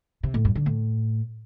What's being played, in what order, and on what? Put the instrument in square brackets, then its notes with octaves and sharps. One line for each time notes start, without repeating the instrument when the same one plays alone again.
[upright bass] C3
A2
G2
D3
A2